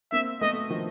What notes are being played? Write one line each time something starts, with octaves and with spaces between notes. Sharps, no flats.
A#3 C4 E5
A3 B3 D#5
D#3 F3